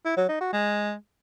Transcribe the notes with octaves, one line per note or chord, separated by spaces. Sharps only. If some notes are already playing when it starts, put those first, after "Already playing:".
E4
F#3
D#4
F#4
G#3